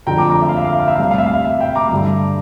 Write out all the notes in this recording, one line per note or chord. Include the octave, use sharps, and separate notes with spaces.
F2 D3 F3 G5 A#5
A#5 D6
A#5 D6
E5
F5
E5
F5
E5
F5
E5
F5
D2 C3 G3 E5
F5
E5
F5
E5
E5
E5 G5
A#5 D6
G2 D3 G3